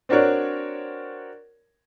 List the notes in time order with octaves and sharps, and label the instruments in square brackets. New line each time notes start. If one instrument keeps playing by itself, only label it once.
[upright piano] C4 D4 F#4 A#4 C#5 D5